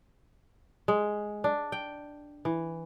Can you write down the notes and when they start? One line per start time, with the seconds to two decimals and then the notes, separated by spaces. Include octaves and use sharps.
0.88 G#3
1.44 D4
1.72 G5
2.45 E3